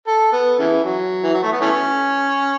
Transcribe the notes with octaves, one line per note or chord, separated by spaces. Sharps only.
A4
B3
C#3 E3
F#3
E3
F#3
A3
B3
E3 A3 C#4